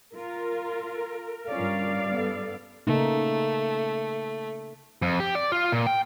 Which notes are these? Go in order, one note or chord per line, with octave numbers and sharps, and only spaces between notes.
F4 A#4
G2 C#4 F4 A#4 D5 F5
B3 A4
C#3 A3 A#3 D#4
F2
G4
D5
F4
A#2
G5